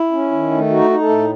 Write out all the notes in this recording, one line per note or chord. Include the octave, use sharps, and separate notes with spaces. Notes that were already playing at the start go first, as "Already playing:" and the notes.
Already playing: E4
C#4
D#3
A3
D#4 F#4
D#4
A3 A4
A2